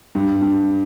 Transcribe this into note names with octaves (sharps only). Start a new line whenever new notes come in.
G2
G2